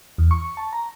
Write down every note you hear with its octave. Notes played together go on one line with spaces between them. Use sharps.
E2
C#6
A5
A#5